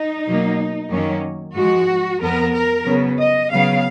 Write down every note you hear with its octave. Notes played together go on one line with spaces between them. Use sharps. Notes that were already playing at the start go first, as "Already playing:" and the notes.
Already playing: D#4
B2 F#3 A#3
F#2 D#3 F#3 A#3 C#4
G#2 F3 G#3 F#4
F2 F3 B3 A#4
A#4
C#3 F#3 B3
D#5
C#3 F#3 B3 F5